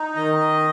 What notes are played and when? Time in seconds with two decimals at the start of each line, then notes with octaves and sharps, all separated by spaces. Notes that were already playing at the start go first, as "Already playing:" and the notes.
Already playing: D#4
0.16 D#3 D#5